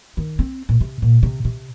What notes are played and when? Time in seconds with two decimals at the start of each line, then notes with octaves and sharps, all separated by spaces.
0.17 D#3
0.39 C4
0.69 A#2
0.81 C3
1.02 A#2
1.23 C3
1.45 C3